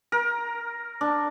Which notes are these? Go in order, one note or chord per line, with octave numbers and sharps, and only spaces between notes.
A#4
D4